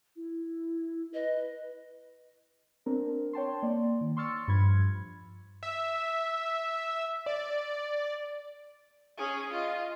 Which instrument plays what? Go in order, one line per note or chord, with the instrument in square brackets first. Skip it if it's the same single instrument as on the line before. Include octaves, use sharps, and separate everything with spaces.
[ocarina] E4
[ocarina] B4 [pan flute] D#5
[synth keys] C4 D4 A#4
C#5 G5 A5 C6
A#3 D5
D#3
C6 C#6 E6 F6 A6 C#7
G2 F3 B5 G#6
[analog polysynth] E5
D5
[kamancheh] C#4 G#4
F4 D#5